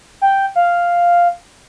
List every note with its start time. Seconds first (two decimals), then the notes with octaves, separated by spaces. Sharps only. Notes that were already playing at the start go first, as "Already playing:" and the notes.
0.22 G5
0.56 F5